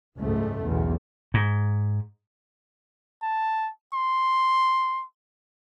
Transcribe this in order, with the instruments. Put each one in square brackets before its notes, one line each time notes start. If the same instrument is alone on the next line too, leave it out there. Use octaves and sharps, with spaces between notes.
[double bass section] F#1 C#2 G#2 A3
B1 E2
[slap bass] G#2
[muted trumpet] A5
C6